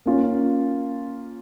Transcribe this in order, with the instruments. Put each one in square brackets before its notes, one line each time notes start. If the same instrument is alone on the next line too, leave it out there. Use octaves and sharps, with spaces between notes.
[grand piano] A#3 C#4 F4